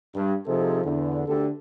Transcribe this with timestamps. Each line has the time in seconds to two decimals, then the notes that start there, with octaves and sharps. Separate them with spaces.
0.15 G2
0.46 C3 F3 D#4 G#4 A4
0.84 E2 D3
1.27 D2 D3 G4 A4